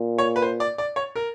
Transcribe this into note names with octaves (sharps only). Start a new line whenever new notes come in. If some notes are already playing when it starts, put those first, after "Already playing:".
Already playing: A#2
C#5
B4
C5
D5
D5
C#5
A#4